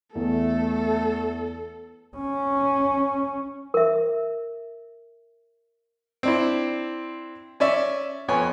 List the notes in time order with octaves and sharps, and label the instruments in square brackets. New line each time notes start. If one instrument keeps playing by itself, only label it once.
[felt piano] E2 [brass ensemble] A3 [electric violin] A4
[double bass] C#4
[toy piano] A#4 E5
[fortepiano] C4 D4 E4
C#4 D5 E5
F2 B3 C#5 G#5